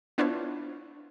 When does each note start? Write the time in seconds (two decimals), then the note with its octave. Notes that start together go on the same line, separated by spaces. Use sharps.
0.18 B3 D4 E4 F4 C5 C#5